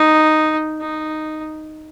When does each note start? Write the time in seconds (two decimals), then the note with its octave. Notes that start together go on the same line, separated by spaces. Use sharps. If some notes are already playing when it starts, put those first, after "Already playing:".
Already playing: D#4
0.81 D#4